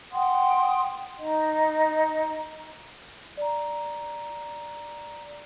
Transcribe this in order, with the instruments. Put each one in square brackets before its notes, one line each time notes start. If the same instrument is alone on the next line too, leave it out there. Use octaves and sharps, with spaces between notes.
[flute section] F#5 G5 C6 D#6
D#4 D#5
[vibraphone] D5 A#5